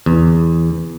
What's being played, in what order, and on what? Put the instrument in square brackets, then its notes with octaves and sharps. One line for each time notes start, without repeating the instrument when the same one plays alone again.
[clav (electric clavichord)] E2